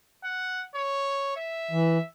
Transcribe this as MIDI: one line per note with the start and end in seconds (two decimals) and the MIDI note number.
0.24 0.63 78
0.75 1.34 73
1.36 2.07 76
1.71 1.98 52